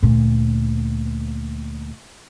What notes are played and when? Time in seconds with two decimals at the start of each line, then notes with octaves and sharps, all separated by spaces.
0.03 D2 A#2